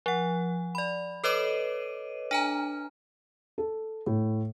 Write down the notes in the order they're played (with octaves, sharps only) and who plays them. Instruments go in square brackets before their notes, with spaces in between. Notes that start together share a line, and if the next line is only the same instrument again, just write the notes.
[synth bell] F3 F#5
D5 B5
A4 B4 C#5 D#5 D6 D#7
D4 G#5 A#5
[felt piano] A4
A2